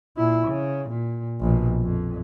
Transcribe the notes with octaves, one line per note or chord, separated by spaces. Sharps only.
A#2 E4
C#3
A#2
A#1 B2
F2